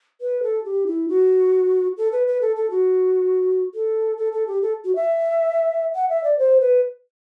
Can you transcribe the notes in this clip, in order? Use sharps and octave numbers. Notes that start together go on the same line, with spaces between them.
B4
A4
G4
E4
F#4
A4
B4
B4
A4
A4
F#4
A4
A4
A4
G4
A4
F#4
E5
F#5
E5
D5
C5
B4